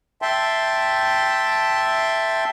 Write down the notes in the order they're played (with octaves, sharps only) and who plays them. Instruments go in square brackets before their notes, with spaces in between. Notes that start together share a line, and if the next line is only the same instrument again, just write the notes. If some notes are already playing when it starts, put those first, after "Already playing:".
[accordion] E5 G5 A5 C6